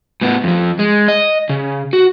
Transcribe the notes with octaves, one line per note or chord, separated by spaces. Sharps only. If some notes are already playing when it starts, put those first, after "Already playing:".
A2 B3
F2 F3
G#3
D#5
C#3
F#4